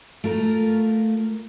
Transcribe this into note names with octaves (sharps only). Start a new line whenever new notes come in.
A3 F4 A#4